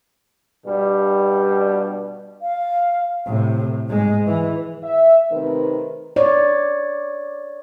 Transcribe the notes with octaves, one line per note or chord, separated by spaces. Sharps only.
G2 B2 G3
F5
A2 C3
G#2 G#3
E3
E5
C3 D#3 A3 C4 A#4 B4
C#5 D5